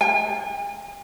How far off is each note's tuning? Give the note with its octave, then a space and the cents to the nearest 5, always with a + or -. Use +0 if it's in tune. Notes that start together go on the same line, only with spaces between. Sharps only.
G#5 -45